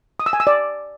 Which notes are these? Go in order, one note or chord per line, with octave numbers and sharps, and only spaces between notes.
D#6
E6
G#5
E6
D5